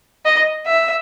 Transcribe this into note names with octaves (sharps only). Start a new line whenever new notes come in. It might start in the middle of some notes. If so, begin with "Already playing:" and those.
D#5
E5